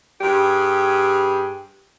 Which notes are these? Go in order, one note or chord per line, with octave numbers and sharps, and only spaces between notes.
G2 G4 G#4